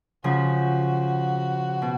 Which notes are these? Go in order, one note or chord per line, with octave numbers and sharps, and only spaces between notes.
C#3 F3 F#4
B2